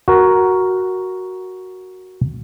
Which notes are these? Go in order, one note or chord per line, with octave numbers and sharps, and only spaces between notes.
F#4 A#4